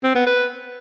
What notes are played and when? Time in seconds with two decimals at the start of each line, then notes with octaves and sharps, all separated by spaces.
0.03 C4
0.15 B3
0.27 B4